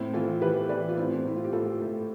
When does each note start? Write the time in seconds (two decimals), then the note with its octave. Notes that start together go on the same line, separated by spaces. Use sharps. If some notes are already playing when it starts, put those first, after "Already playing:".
Already playing: A2 C4 E4
0.13 E3 F4 A4
0.41 E3 G4 B4
0.69 E3 B4 D5
0.89 F4
0.97 A2 C4 E4
1.24 A2 E4
1.36 F4
1.44 G4
1.52 A2 F4 A4
1.81 A2